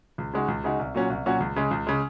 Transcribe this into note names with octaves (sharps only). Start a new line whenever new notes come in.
C#2
C#3 G#3 D#4 F#4
C#2
C#3 G#3 D#4 F#4
C2
A#2 F#3 C#4 F#4
C2
A#2 F#3 C#4 F#4
C#2
C#3 G#3
C#2
C#3 G#3